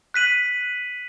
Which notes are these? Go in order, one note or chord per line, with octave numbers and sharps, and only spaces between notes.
F#6 B6 D#7 F#7